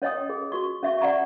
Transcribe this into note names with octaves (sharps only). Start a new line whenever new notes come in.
C#4 C#5 D#5 G5 D#6
G#4
F#4 C#6
C#4 E5 C#6
D5 F#5 A#5 C#6